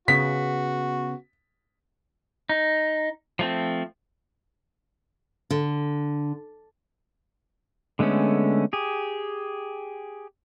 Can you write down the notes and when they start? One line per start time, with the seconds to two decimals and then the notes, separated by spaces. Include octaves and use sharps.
0.08 C#3 B3 F#4 B6
2.49 D#4
3.39 F3 A3 C4
5.50 D3
7.99 D3 G#3 A3 B3 C#4
8.73 G4 G#4